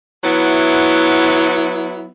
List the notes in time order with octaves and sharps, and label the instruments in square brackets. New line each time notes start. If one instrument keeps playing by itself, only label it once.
[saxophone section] F#3 B3 E4